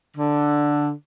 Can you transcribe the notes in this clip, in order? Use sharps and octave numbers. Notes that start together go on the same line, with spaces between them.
D3